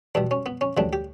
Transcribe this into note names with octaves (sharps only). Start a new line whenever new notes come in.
E2 B2 G3 D4
C#4
B3
C#4
D2 C#3 E3 G3 D4
G4